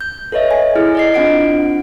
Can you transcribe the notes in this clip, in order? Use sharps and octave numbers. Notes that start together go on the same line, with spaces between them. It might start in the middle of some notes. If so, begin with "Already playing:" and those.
G6
A4 B4 C#5 D#5 E5
G#5
E4 G#4 F6
D5 D#5 C7
C4 D4 F4 F#5 C7 D7